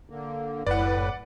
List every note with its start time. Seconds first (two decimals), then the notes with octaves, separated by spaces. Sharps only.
0.09 D3 A#3
0.67 F#1 A2 B4 D5 F#5